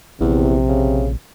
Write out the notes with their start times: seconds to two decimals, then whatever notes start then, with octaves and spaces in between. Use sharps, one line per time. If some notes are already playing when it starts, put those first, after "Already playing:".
0.21 A#1 E2 C3
0.69 C#3